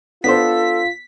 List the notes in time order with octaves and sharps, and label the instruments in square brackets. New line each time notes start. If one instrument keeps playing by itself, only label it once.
[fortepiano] B3 D4 C5 [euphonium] F4 [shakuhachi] A4 [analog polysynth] B6